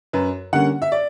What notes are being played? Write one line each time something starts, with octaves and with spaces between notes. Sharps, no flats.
F#2 B4
D3 G3 A#3 C#4 F#5
E5
D5